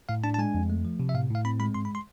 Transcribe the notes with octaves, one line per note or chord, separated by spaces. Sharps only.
A2 F5
D4 A5
A5
G#3 G#5
F2
A3
F3
C3
E5
A2 F5
A2 F5
C4 B5
G#3 B5
G#2 C6
B5
C6